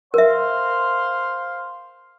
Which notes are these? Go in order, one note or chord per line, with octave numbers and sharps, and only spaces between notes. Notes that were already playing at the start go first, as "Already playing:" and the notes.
A#4 C5 E5 F5 C6